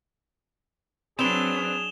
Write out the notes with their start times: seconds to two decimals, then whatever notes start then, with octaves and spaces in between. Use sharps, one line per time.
1.19 F#3 C4 D4 G#4 B4 E7 F7 G7